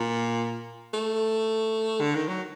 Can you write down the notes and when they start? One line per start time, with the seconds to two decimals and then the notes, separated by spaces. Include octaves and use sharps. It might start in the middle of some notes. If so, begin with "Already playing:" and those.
Already playing: A#2
0.94 A3
2.01 D3
2.15 D#3
2.28 F#3